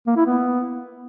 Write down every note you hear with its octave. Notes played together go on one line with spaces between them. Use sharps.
A#3
E4
B3